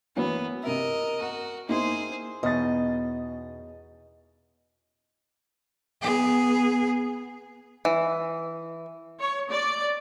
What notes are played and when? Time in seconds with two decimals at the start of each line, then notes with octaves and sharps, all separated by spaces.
0.16 E3 F#3 A#3 B3
0.63 C3 A#4 D#5 E5
1.21 F#4 A#4
1.69 A#3 D#4 E4 G#4 C5
2.43 E2 B2 C#4 D#4 D#5 A6
6.02 B3 G#4
7.85 E3
9.19 C#5
9.49 D5